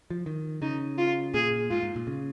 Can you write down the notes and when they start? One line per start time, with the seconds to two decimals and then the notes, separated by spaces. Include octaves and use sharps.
0.10 F3
0.26 D#3
0.62 C#3 D#4
0.98 F4
1.34 A#2 G#4
1.71 G#2 F4
1.83 G#2
1.96 A#2
2.07 C#3